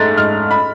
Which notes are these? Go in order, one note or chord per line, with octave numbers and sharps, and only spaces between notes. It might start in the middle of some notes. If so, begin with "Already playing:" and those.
Already playing: G#2 A3 A6
G#2 F6
B5